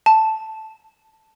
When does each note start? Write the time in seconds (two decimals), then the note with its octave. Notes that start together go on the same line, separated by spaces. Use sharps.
0.06 A5